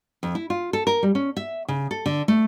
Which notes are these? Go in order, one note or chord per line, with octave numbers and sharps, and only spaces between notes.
F2
E4
F4
A4
A#4
G3
C#4
E5
C#3
A4
D3
A3